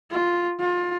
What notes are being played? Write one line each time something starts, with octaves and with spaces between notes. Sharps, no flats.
F4
F4